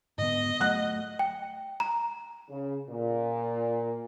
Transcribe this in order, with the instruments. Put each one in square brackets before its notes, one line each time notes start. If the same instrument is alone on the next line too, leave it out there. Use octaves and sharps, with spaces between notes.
[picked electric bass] G#2 D3 B3 [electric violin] D#5
[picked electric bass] F#3 A3 [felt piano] F#5 F#6
[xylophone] G5
A#5
[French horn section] C#3
A#2